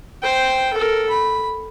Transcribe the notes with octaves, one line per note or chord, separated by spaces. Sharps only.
C5 G5
A4 A#4
B5